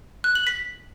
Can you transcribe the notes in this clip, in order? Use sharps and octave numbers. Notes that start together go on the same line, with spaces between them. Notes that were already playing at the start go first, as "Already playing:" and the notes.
F#6
F#7
B6